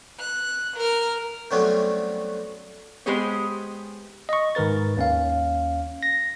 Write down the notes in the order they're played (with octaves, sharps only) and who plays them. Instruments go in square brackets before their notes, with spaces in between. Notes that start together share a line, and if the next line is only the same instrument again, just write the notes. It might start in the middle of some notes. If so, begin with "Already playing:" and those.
[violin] F#6
A#4 F6
[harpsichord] C3 F#3 G3 A3 B3 C#4
[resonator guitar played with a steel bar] G#3 B3 G4 G#4 C5 C#5
[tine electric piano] D#5 C#6
G#2 D#3 A#4 B4 A6
D#2 C#4 F5
A#6